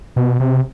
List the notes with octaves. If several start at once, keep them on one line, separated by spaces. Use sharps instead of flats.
B2
C3